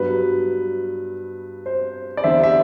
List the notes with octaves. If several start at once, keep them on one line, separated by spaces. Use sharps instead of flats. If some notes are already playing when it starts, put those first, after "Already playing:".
Already playing: G2 F#3 B3 B4
C5
D5
E2 D3 G3 C5 E5
E5